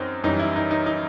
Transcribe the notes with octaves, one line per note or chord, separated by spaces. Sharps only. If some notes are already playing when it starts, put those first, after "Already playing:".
Already playing: F#2 C4 D#4 F#4
F#2 E3 G3 D#4
E4
D#4
D#4
D#4